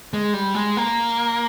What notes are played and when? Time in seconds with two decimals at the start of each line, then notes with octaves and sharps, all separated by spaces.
0.13 G#3
0.34 G3
0.55 G#3
0.77 A#3